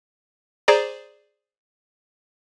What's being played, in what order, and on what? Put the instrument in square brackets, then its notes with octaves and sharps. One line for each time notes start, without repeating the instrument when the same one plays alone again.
[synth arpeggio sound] G#4 C5 D5 A#5